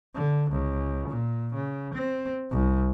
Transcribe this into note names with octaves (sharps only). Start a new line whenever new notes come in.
D3
C#2
A#2
C#3
C4
C2